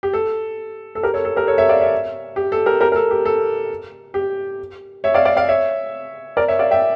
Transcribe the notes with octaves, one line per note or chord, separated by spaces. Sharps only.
G4
A4
A4
G4 A#4
A4 C#5
A4
G4 A#4
A4 C#5
C#5 E5
D5 F5
C#5 E5
G4
A4
G4 A#4
G4 A#4
A#4
A4
G4
A4
G4
C#5 E5
D5 F5
D5 F5
D5 F5
C#5 E5
A#4 D5
C#5 E5
D5 F5
E5 G5